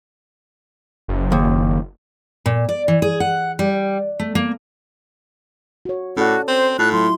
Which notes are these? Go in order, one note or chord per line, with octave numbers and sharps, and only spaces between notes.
F#1
D#2
A#2
D5
E3
G#4
F#5
G3
A3
A#3
F#4 C#5
A2 C#4 F#4 A4 D5
C4 C5
A2 F4 F#6
F#3 E4 C6